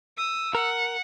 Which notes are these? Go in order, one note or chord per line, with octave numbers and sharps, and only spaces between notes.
D#6 E6
A#4 F#5